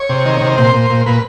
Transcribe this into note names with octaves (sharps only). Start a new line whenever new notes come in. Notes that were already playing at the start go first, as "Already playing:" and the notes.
Already playing: C#5
C3
D#3
C3
A#2 C5
A#2
A#2
A#2 B4